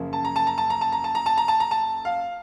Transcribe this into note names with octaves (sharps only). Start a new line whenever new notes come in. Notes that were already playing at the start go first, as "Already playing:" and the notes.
Already playing: F#2 C#3 F3 A#3
A5
A#5
A5
A#5
A5
A#5
A5
A#5
A5
A#5
A5
A#5
A5
A#5
A5
F5